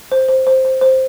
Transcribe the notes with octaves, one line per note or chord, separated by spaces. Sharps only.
C5
C5
C5
C5
C5